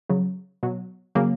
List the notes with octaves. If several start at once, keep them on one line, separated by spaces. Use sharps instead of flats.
C#3 F#3
B2 F#3
C#3 F#3 A#3